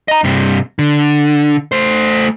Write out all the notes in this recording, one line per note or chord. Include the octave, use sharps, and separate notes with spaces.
D#5 A#5
G2 C3
D3
A3 C5